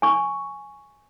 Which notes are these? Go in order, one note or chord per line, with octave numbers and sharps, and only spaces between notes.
G#5 C#6